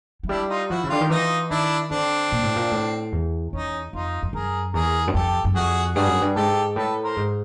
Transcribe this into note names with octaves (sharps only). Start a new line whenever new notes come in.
F#3
G3 D4 E4
D#4 F4
F3 E4 F#4
C#3
D3 F4 G4
D#3
E3 D#4 F4
D#3 D4 E4
D3 C4 D4
A#2
A2
A#2
A2
E2
E2 C#4 D#4
F2 D#4 F4
F2
F#2 G#4 A#4
E2 G#4 A#4
F#2
F2 G4 A4
F#2
F2 F#4 G#4
G2 F#4 G#4
F#2
G2
G#2 G4 A4
A2 A4 B4
A#4 C5
G#2